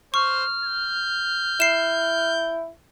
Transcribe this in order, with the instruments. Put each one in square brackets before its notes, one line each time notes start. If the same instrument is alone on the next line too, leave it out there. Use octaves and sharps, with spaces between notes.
[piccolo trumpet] C5 [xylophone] C#6 [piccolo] F6
[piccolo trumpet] G6
[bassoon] E4 [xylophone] C7 E7